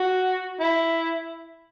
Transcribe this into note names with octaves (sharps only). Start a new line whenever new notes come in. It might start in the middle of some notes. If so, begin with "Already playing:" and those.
Already playing: F#4
E4